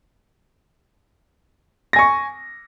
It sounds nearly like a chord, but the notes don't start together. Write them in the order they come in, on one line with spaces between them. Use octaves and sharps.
A#6 G#5 C#6